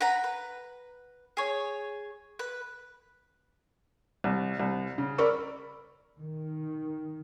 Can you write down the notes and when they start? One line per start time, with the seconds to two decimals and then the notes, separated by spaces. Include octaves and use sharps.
0.01 B4 F#5 A#5 B5
0.24 B4
1.37 G#4 C#5
2.39 B4
4.24 C2
4.59 C2
4.98 C#3
5.18 A#4 D5 B5 C#6 E6
6.19 D#3